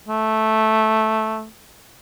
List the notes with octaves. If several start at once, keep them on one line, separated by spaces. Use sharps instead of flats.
A3